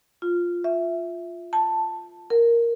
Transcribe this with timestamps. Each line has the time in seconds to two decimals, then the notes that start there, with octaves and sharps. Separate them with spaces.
0.22 F4
0.64 E5
1.53 A5
2.30 A#4